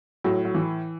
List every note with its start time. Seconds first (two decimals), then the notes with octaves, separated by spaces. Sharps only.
0.24 A2 F#3
0.45 F#3
0.55 E3